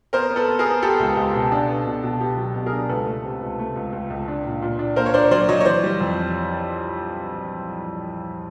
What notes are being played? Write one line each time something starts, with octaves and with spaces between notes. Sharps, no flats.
B3 A#4 C5
B3
A4 B4
B3
G#4 A#4
B3
B3 G4 A4
C#2
C#2
B2
D4
B3
B2
B2
B3 G4
F#3
B2
G#4 A#4
D4
C#2 A4 B4
A3
C3
C#2
A3
C#2
C#2
C#2
D4
A#2
A#2
D4
A#3 A#4 C5
C#5
D4 C5 D5
F#3 C5 D5
F#3 C#5 D#5
C#5
E3 C5 D5
G3
F2